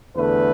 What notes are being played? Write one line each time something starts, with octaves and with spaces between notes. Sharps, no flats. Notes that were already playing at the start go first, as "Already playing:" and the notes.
E2 D3 A3 B4